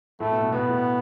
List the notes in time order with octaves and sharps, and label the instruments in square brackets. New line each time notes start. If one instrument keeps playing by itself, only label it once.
[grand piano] A2 [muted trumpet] A3
[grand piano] B2
B2
[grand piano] B2 [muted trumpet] B3
[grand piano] A2